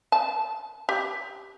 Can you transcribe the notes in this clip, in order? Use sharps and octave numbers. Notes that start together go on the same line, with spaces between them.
A5
G4